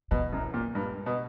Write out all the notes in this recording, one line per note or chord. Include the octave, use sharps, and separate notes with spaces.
B2 E3
F#2
A#2
G2
B2